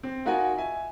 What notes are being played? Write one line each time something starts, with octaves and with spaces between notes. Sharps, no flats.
C4
D#4 F4 F#4 A#4 F#5 G#5
E5 G#5